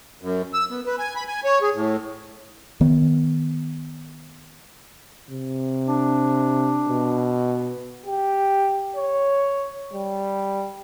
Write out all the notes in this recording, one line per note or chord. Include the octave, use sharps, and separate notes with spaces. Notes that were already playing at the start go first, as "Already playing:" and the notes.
F#2
E6
B3
B4
G#5
B5
G#5
C#5
G#4
A2
D#3 B3
C3
D4
B2
G4
C#5
G3